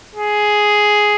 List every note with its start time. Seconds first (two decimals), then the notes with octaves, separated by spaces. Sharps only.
0.15 G#4